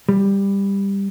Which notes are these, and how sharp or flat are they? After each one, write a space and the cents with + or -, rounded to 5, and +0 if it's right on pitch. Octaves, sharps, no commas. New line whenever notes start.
G3 +15